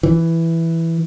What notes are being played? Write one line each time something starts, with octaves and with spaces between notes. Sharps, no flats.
E3